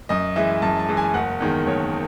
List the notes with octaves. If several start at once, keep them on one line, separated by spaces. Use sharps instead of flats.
F#2 D#5
E3 G#3 E5
F#2 A5
A5
E3 G#3
G#5
F#1 F#5
E2 D#3 G#3
F#1 C#5